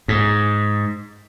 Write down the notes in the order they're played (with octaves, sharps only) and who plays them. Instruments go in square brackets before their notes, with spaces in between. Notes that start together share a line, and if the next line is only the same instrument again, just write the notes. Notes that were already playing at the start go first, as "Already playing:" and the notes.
[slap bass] G#2